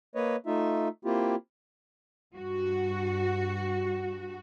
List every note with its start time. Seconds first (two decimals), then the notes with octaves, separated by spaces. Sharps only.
0.15 A#3 B4 C#5 D#5
0.46 A3 D#4 F4 E5
1.05 A#3 C4 E4 F4 G4
2.36 G2 F#4